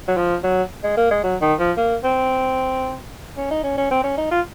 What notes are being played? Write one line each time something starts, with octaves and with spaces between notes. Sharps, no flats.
F#3
F3
F#3
G#3
A#3
G#3
F#3
D#3
F3
A#3
C4
C#4
D#4
C#4
C#4
C4
C#4
D#4
F4